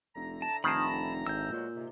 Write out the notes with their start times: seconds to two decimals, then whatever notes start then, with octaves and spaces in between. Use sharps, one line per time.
0.15 F1 D3 E4 A#5
0.42 A5
0.64 F1 D#3 C5 G#5 A5 B5
1.27 G#1 E6 G6
1.52 E2 A#2 F#3 G#3
1.75 G#2 C3